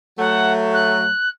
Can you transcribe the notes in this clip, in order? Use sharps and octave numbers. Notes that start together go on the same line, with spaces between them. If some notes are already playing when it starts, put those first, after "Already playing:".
F#3 A3 F#5
F#6